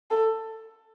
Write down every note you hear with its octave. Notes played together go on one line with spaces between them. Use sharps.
A4